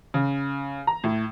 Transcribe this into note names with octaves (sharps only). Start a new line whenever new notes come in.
C#3
A#5
A2